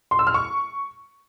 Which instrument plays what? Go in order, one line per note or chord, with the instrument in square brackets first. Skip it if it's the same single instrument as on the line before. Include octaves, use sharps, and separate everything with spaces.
[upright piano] C6
E6
F6
C#6